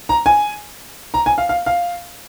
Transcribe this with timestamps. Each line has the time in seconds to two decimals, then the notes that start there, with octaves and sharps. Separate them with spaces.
0.09 A#5
0.26 G#5
1.14 A#5
1.26 G#5
1.38 F5
1.49 F5
1.66 F5